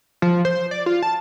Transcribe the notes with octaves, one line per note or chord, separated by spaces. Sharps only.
F3
C5
D5
F4
A5